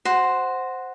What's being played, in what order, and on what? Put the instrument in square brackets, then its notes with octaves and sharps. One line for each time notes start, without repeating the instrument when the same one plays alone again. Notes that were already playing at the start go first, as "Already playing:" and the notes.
[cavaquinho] F#4 C5